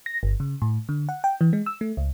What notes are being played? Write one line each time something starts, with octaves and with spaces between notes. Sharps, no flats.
A#6
G1
C#3
A2
D3
F#5
G5
E3
G#3
E6
A3
C#2